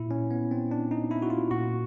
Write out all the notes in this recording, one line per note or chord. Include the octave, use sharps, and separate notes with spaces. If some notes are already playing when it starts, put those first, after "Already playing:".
Already playing: A#2 E4
C#4
B3
C4
D4
D#4
E4
F#4
F4
A#2 F#4